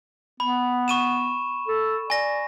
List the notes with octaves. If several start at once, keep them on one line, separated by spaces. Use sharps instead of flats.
B3 B5
C#6 D#7 E7
A4
D5 G#5 A#6